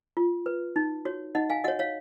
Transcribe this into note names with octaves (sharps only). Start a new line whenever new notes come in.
F4
B4
D#4
F#4 C#5
D#4 D#5 F#5
F5 G#5
F#4 C#5 D#5 F#5
C#5 F5